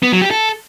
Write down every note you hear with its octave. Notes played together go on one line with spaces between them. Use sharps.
B3
F#3
G4
A4